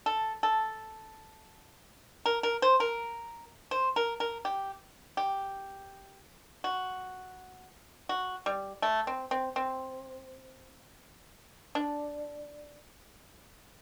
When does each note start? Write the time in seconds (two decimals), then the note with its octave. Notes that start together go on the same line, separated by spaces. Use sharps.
0.06 A4
0.43 A4
2.26 A#4
2.43 A#4
2.62 C5
2.80 A#4
3.71 C5
3.96 A#4
4.20 A#4
4.45 G4
5.17 G4
6.64 F#4
8.09 F#4
8.46 G3
8.82 A3
9.07 C4
9.31 C4
9.56 C4
11.75 D4